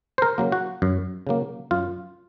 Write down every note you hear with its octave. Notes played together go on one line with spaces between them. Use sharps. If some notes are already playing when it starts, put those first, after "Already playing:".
C5
A#4
C#3 F#3 A#3
F#4
F#2
C#3 F#3 A#3
F#2 F4